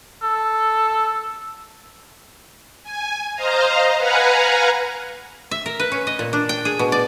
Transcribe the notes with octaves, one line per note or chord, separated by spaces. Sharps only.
A4
G#5
C5 D#5 F5 A#5
B4 F5 F#5 G#5 A#5
E5
A#4
B4
C#4
D#5
A#2
D4
G5
G#4
B2
D5